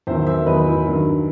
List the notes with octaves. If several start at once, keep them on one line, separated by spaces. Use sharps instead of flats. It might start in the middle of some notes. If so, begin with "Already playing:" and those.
E2 D#3 F#3 C5 E5
C5 E5
E2 D#3 F#3 B4 D#5
E4
G2 D#3 F#3